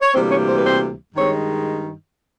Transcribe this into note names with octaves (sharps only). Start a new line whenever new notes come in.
C#5
D2 C3 E3 G3 A#3 C4 C5
C#4 C#5
C5
B4
C4 C5
G2 D#3 G#3 C4 C#5